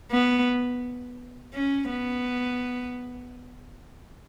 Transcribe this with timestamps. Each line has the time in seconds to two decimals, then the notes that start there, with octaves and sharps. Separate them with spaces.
0.11 B3
1.54 C#4
1.89 B3